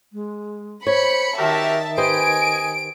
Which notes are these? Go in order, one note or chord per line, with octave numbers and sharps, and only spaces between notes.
G#3
C5 C#5 B5 C#7
D#3 F#4 G4 A#4 E5 A5
G4 B4 C5 D#5 G#5 D7